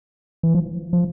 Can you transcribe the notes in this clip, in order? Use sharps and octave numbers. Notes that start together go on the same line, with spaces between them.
E3
F3
F3